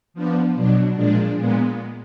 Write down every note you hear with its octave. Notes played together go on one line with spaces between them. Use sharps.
F3 B3 D4
B2 F#3 D4
A#2 F3 G#3 D4
A#2 G#3 B3